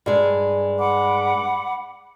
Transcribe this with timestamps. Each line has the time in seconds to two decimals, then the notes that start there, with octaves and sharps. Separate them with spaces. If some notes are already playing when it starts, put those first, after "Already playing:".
0.06 G2 G#3
0.79 F#5 B5 D6